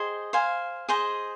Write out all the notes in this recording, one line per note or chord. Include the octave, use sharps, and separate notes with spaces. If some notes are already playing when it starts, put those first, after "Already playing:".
Already playing: G#4 C5 D#5 G5
C5 F5 G#5
G#4 C5 D#5